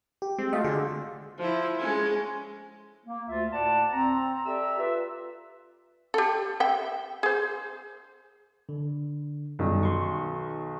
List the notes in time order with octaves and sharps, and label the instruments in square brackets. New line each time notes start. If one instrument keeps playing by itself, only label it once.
[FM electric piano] G4
[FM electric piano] G#3 [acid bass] C4
[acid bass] A3 [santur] F4 F#4 G5 [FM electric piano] D#5
[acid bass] D3 [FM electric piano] G#4
[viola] F3 E4
G#3 C#4
[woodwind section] A#3
D2 F4 E5
D2 A2 D5 F#5 A5
C4 A#5
G4 A4 D5 E5 A#5 E6
F4 B4 E5
[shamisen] G4 A4
E5 G5
G#4 C5
[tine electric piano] D3
[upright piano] B1 D#3 F#3 [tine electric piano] F#2 G3
[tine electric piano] C6 C#6